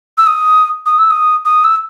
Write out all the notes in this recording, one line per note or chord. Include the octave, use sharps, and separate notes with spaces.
E6
D#6
D#6
E6
D#6
D#6
E6